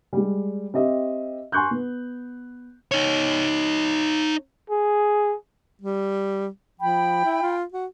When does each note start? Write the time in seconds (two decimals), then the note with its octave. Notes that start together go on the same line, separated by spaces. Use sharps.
0.13 G3 G#3
0.74 C4 G4 D#5 E5
1.52 G#5 C6 C#6 F#6 G6
1.71 B3
2.92 D#4 C#5
4.70 G#4
5.82 G3
6.80 F3 G5 B5
7.24 E4
7.42 F4
7.72 F#4